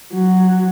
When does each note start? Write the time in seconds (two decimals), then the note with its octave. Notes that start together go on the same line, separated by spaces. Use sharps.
0.13 F#3